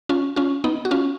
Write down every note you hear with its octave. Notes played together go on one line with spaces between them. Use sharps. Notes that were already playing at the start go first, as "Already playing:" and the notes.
C#4 F4
C#4 F4
B3 D#4
F#4
C#4 F4